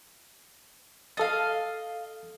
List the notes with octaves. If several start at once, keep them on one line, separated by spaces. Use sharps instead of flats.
A4 D#5 F5 A6